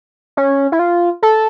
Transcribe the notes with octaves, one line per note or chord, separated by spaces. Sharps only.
C#4
E4
F4
A4